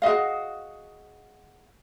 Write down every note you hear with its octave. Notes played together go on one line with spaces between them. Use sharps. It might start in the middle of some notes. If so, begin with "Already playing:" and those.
F#4 G#4 D#5 F5